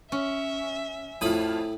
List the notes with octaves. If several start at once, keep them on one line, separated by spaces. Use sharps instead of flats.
C#4 E5
F2 A2 F4 B5 D#6